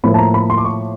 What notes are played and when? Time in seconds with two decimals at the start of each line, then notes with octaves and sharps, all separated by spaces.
0.04 A2 F3 A#3 B5
0.14 A5
0.18 A#5
0.34 B5
0.50 C6
0.58 D6
0.65 C#6